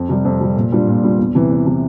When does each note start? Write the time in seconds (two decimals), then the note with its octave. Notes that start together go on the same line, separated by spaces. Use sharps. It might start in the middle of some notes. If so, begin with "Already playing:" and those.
Already playing: F2
0.09 C3 G3
0.25 F2
0.40 C3 G3
0.56 A#2
0.72 G3 D4 F4
0.88 A#2
1.04 G3 D4 F4
1.19 E2
1.35 C3 E3
1.51 E2
1.66 C3 E3